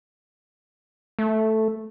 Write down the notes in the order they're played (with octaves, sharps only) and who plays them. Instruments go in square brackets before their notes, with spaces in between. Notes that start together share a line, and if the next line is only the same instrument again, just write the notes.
[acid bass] A3